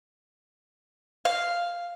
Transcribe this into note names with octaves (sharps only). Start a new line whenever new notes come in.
F5